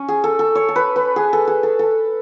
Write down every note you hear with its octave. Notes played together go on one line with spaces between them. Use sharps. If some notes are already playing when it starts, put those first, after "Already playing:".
Already playing: C#4
G#4
A4
A4
C#5
A4
B4
B4
G#4
A4
G#4
A4
A4